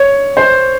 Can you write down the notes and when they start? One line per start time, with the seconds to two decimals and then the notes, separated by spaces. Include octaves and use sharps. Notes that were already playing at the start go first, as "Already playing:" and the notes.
Already playing: C#5
0.37 C5